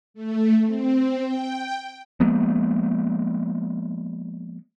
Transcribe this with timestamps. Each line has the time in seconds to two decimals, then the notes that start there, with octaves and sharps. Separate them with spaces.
0.14 A3
0.65 C4
1.23 G5
2.20 F3 G#3 A#3 B3